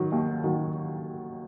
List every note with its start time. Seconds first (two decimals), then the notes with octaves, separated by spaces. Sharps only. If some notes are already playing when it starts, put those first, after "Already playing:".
Already playing: D#3 F#3
0.12 D#2
0.44 D#3 F#3